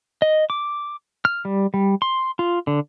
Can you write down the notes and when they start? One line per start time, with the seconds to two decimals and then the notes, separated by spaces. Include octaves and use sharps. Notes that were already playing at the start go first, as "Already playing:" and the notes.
0.22 D#5
0.50 D6
1.25 F6
1.45 G3
1.74 G3
2.02 C6
2.39 F4
2.67 D3